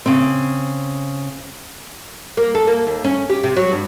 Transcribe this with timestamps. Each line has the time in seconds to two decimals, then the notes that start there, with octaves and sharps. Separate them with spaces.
0.06 C#3 C4
2.37 A#3
2.55 A4
2.67 A#3
2.87 D#2
3.04 C#4
3.30 G4
3.44 C3
3.56 F#3
3.72 G2